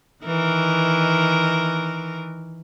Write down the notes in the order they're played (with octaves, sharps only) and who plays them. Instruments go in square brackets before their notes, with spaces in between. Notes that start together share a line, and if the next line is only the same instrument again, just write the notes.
[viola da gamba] D#3 E3 A#4